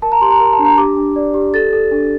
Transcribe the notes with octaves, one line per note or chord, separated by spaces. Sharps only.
A#4 A5
A#5
G4 C6
A#5
A#4
A5
D4
A#5
G4 D6
D4
D5
G4
A4 A6
A4
D4